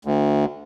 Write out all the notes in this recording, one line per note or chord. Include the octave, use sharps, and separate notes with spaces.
D2